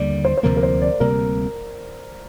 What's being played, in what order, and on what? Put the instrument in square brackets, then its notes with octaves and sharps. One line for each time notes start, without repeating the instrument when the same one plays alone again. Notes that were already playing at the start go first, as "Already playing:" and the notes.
Already playing: [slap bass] D#2 D3 G3 A#3 [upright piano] D5
[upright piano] C5
C5
[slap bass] D2 C3 F3 A#3 [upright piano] A#4
[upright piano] A#4
C5
D5
[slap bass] D2 C3 G3 A#3 [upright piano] A#4